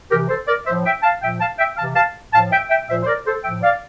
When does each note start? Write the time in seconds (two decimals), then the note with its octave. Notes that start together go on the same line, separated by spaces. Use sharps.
0.10 C3 G4 A#4
0.15 E3
0.29 A4 C5
0.47 A#4 D5
0.66 A2 F3 C5 E5
0.85 E5 G5
1.03 F5 A5
1.21 A#2 F3 E5 G5
1.40 F5 A5
1.58 E5 G5
1.77 C3 E3 F5 A5
1.95 F5 A5
2.33 A2 F3 F5 A5
2.52 E5 G5
2.70 E5 G5
2.89 A#2 F3 C5 E5
3.03 C5
3.07 A#4 D5
3.26 A4 C5
3.44 A2 F3 E5 G5
3.62 D5 F5